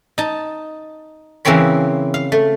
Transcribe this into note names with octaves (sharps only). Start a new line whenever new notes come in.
D#4 A5
C#3 E3 A#3 C4 C#5 B5
F5
A3